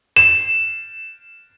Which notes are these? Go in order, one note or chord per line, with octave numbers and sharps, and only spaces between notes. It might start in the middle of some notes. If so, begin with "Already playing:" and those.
E7